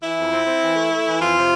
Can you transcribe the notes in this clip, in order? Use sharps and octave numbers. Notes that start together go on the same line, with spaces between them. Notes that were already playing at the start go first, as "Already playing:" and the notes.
E3 E4
F2
C4
C4
E3
A3
A3
E3
F2 F4
C3